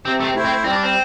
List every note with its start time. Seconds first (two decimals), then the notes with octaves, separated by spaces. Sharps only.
0.05 C3 C4
0.20 A3
0.24 C4
0.34 A3 E4 C5
0.45 C4
0.64 G3 C4
0.73 D4
0.83 C4